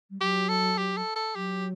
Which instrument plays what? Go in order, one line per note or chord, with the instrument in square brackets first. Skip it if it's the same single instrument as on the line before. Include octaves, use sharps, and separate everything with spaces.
[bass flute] G3
[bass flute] F#3 [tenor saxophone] G4
[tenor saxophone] A4
G4
A4
A4
[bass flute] F#3 [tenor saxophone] G4